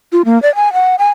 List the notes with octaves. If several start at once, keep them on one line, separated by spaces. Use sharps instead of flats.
F4
A#3
D5
G#5
F#5
G#5